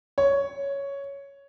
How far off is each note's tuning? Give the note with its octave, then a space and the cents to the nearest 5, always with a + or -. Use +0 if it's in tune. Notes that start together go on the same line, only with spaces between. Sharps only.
C#5 +5